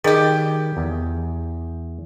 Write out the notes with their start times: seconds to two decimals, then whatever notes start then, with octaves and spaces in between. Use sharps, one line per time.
0.04 D#3 G3 G4 G#4 D#5
0.77 E2